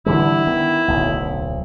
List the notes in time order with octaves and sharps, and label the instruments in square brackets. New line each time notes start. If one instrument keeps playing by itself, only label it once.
[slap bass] D3 E3 G3 [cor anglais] E4
[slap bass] D#3 B3
D1 B1